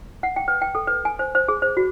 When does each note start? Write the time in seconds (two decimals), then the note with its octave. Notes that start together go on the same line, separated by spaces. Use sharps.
0.23 F#5
0.36 G5
0.48 B4
0.62 G5
0.75 A4
0.87 B4
1.05 G#5
1.19 C5
1.35 C5
1.48 G#4
1.62 C5
1.77 F#4